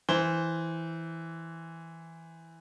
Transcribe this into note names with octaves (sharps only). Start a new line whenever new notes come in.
E3 C5 G7